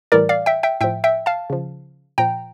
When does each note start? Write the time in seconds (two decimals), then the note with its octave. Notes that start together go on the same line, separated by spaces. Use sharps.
0.12 A2 E3 G3 A#4 D5
0.29 D5 F5
0.46 E5 G5
0.63 E5 G5
0.81 A2 F3 E5 G5
1.04 E5 G5
1.26 F5 A5
1.50 C#3 F3
2.18 A#2 F3 G5 A#5